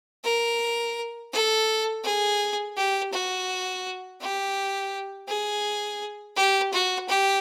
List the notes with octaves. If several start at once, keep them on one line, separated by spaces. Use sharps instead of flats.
A#4
A4
G#4
G4
F#4
G4
G#4
G4
F#4
G4